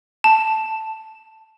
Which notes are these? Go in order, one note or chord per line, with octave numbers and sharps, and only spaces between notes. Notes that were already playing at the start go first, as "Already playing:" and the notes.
A5